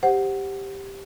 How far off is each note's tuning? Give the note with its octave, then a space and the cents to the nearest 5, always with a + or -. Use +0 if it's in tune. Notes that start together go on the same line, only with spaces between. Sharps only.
G4 +0 C5 +5 F#5 +0